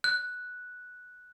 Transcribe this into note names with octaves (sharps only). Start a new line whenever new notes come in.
F#6